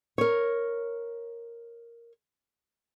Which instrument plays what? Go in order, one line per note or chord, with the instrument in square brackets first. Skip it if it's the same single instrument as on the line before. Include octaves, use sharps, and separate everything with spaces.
[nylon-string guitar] A#4 C#5